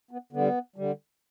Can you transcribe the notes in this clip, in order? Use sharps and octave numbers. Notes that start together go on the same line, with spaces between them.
B3
D3 G3 B3
D3 G3